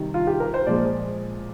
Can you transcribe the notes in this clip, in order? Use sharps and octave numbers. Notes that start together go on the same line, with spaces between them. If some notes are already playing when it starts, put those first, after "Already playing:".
Already playing: C3 D#3 G3
F4
G4
A#4
C5
A#2 F3 G#3 D5